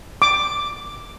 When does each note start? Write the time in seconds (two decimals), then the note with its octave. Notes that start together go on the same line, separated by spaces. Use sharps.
0.22 D6